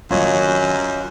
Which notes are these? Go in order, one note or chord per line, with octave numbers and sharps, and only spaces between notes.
F#2 D#3 F#3 F4 C#5 D#5